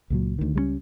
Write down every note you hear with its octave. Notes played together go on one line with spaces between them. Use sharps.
C#2 A#2 F#3
D2 D#3
C#2 G3 G#3 C#4